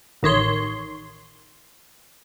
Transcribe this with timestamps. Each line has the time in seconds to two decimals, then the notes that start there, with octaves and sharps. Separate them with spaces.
0.23 A1 D#3 C#5 C6